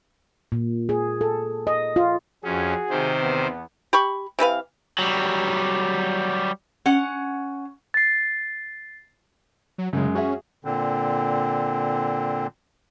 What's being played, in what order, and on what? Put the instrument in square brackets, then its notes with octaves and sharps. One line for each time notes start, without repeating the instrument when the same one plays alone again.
[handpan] A#2
G#4
A4
D#5
F4
[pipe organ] F2 C#4 [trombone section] F#4 G#4
[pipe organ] C3 D#3 C5
[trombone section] E2 B3
[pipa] G4 B5 C#6
C3 E3 B4 F5
[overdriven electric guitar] F#3 G3
[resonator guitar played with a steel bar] C#4 F#5
[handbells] A6 C7
[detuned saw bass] F#3
[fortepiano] F#2 G#3 [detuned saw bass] C#3
[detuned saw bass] C#4 [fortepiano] F#4 G#4 E5
[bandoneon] A#2 D3 C4